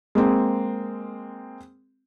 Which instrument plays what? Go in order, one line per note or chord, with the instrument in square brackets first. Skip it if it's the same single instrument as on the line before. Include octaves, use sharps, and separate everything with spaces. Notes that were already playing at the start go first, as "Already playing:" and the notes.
[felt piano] G#3 A#3 C4